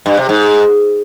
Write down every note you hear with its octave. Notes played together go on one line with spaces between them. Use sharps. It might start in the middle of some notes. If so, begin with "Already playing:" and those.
G2
C3
G#2